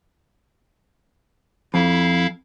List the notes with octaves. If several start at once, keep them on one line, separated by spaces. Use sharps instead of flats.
F2 E4 F5